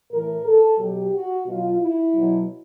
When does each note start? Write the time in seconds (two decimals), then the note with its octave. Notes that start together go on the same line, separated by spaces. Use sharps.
0.12 A2 E3 A#4
0.45 A4
0.79 B2 F#3 G4
1.13 F#4
1.47 B2 F#3 F4
1.81 E4
2.15 B2 F#3